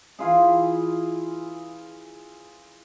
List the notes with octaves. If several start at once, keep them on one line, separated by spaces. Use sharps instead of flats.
E3 E4 F4 G#4